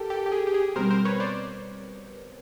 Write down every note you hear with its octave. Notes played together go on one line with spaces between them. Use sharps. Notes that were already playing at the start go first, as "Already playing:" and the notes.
Already playing: G4 A4 A#4
G4 A4
G4
G#4
G4
G#4
B2 G3 C4 A#4 C5
A#4 C5
B4 C#5
C5 D5